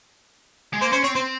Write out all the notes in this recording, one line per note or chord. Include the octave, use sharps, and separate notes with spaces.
G#3
A#3 C5
C#4 C5
C4 C#5
C4 C5